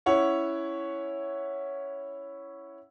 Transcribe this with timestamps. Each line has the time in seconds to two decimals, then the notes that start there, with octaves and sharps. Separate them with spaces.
0.06 C#4 E4 C#5 F#5